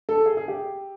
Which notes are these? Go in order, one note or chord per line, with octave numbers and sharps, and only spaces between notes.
A4
G#4
G#4
G4